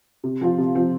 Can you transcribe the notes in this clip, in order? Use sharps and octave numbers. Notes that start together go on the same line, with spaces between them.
C3
F3 C4 F4
C3
F3 C4 F4